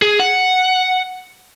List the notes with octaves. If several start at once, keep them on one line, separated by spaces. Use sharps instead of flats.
G#4
F#5